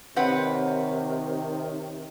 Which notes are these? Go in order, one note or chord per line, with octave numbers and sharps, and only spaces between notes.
C3 D#3 C4 B4 C#5 F#5